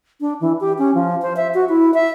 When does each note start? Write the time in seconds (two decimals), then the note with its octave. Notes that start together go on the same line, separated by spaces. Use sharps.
0.21 D4
0.41 E3
0.61 G4
0.78 C#4
0.95 F3
1.22 C5
1.36 E5
1.54 F#4
1.69 E4
1.94 E5